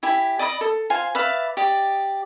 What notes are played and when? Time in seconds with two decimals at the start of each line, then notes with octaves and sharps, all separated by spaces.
0.03 E4 G4 G#5
0.39 D5 D#5 B5 D#6
0.61 A4
0.90 F4 C5 F5 G#5
1.15 B4 D5 E5 F5
1.57 G4 D5 D#5